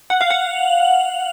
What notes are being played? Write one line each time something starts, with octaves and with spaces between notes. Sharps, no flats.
F#5
F5
F#5